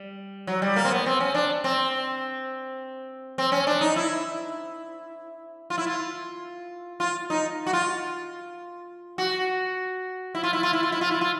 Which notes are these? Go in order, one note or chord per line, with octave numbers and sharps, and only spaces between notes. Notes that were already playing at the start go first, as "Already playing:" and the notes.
Already playing: G3
F#3
G3
A#3
C4
B3
C4
C#4
D4
C4
C4
C#4
D4
D#4
E4
F4
E4
F4
F4
D#4
F#4
F4
F#4
E4
F4
E4
F4
E4
F4
E4
F4
E4
F4